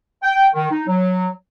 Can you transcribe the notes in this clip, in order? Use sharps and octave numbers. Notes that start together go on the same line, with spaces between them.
G5
D#3
D#4
F#3